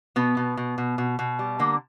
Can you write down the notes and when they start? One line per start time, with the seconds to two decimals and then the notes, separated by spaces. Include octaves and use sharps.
0.16 B2 B3
0.37 B2
0.57 B2
0.78 B2
0.98 B2
1.19 B2
1.39 G3
1.59 D3 A#3